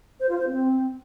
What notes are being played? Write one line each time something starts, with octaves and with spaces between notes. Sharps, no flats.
C5
F4
C5
C4